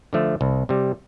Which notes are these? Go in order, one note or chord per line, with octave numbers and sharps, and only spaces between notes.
D3 F3 A3
C2
C3 G3